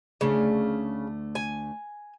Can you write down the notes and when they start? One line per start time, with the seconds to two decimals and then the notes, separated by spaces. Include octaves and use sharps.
0.21 D2 C#3 A3 D4
1.35 G#5